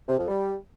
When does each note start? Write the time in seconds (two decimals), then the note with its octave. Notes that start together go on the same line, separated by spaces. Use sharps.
0.09 C3
0.18 F2
0.28 G3